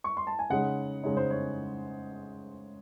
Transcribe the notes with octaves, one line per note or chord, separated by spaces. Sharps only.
C#6
C6
A5
G#5
C#3 G#3 D#4 F#5
C#3 G#3 D#4 C#5
C5
C#5